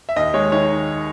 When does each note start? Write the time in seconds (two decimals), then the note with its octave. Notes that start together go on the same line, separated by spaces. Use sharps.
0.09 E5
0.16 D#2 D#5
0.34 G#3 C#5
0.52 D#3 C#5